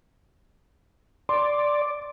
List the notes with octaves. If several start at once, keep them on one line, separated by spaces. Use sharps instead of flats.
D5 C6